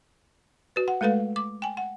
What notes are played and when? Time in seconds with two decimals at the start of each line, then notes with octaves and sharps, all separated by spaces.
0.76 F#4 B4
0.88 F#5
1.01 G#3 A3 A4 B4 F5
1.36 D6
1.62 G5 G#5
1.77 F#5